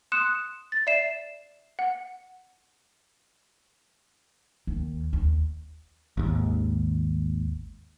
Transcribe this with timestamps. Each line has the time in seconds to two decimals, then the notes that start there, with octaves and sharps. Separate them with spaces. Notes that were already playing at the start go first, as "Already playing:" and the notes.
0.12 C6 D#6 F#6 C#7 E7
0.72 A6
0.87 D5 E5 C7 E7
1.79 F#5
4.67 D#2
5.13 D#2
6.17 G#1 D#2